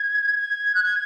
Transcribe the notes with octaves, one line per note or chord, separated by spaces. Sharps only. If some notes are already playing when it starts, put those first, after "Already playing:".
Already playing: G#6
G#6
F#6
G#6